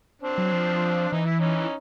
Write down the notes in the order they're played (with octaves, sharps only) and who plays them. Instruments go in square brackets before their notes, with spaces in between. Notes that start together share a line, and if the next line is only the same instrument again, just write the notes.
[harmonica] C4 D4
[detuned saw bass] F#3
F3
[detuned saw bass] E3 [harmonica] D#4
[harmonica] E4
C#4 D#4